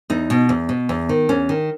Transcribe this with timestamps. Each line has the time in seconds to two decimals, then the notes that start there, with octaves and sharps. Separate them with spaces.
0.10 E2 D#4
0.30 B2
0.49 E2
0.69 B2
0.89 E2
1.09 D#3
1.29 E2 C#4
1.49 D#3